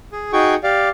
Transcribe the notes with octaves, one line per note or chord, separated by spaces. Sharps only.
G#4
D#4 F#4 G#4 G5 C#6
G4 D5 F5